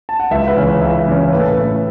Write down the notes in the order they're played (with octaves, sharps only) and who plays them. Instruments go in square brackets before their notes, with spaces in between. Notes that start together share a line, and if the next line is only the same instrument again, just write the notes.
[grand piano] A5
F#5
C#2 E4 E5
B4
C#3 E3 C#4
C#2 E4 E5
C#3 E3 C#4
A2 B4
A4
B4
A3 C#4 E4